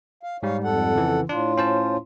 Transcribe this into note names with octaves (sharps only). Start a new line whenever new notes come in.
F5
G#2 G3 C#5 F5
F2 A4 F#5
C#3 E3
A2 D4 F4
C#4 C5 A5